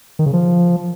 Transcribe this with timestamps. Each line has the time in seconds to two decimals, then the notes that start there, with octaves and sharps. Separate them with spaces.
0.19 D#3
0.26 C#3
0.33 F3